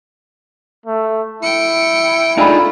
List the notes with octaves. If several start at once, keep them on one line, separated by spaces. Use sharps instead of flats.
A3
E4 G5 C#7
A3 D4 D#4 F4 G#4 G5 B5